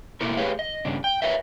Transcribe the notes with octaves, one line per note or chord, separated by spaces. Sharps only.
B2 A3 A#3 E4 A4 A#4
A3 G4 G#4 B4 C#5 F5
D#5
G2 C#3 D4
G5
A#4 B4 C#5 D#5 E5